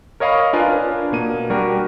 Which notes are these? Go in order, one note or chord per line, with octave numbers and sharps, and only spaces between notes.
A#4 C#5 D#5 F5 A#5 B5
D4 F4 A#4 B4 G#5
D4
B2 A#3 D#7
G3 D4 F#4 G4 A#4